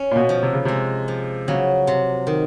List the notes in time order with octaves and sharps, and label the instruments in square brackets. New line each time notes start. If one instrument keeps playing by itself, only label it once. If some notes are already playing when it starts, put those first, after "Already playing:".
Already playing: [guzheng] C#4
[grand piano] A#2
B2
[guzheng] F3
[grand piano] C3
C#3
[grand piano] C3 [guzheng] G#3
[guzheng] F3
[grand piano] C#3 [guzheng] F#3
[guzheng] C3
D#3